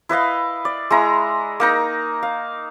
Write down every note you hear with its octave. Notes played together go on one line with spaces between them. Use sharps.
E4 B4 D#5 F5
D5
G#3 E4 A#5
A#3 D#4 A#5
F5